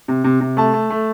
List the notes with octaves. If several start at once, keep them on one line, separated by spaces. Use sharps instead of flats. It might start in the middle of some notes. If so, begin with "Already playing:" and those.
C3
C3
C3
A3 A5
A3
A3